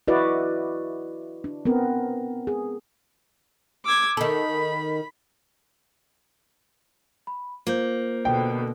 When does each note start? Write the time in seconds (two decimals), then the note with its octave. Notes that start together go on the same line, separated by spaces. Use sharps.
0.08 E4 F#4 B4 D5 D#5
1.44 D4
1.65 B3 C4 A#4
2.47 G#4
3.84 D6 E6 G#6
4.17 D#3 A4 B5
7.27 B5
7.67 A#3 F4 C5 G6
8.25 B2 D3 G5